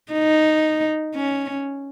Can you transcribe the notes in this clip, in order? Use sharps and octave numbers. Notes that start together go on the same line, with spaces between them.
D#4
C#4